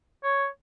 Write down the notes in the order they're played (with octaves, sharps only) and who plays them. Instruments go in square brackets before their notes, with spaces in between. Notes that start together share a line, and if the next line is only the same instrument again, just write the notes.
[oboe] C#5